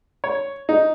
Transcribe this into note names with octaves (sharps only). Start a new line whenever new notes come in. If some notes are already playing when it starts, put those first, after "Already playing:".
C#5
D#4